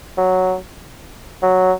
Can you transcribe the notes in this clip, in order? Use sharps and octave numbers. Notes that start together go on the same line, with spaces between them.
F#3
F#3